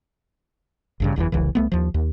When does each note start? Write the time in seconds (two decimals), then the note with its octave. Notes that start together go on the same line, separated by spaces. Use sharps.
1.00 A1 G2 C#3
1.16 F#1 E2 G2 E3
1.32 F1 C2 C#3 E3
1.55 C2 A3 B3
1.72 D#2 F3
1.94 D#2